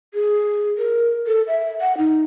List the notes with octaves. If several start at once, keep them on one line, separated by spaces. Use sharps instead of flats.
G#4
A#4
A4
E5
F#5
D#4